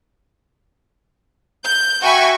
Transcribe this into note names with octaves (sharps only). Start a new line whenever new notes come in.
G6
F#4 E5 G5 G#5 B5 C#6